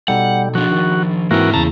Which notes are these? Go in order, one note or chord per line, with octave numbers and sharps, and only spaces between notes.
B2 G3 D#4 A4 F#5
F3 D4 F#4
D#3
G#2 E3 A#3 C4 E4 F#4 A#4
E2 C#3 A5 A#5